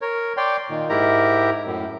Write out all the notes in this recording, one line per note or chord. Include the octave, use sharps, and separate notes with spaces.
A#4 C#5
C#5 D5 G5 C6
A#2 D#3
G#2 E4 G4 A#4 A#5
F#2 A2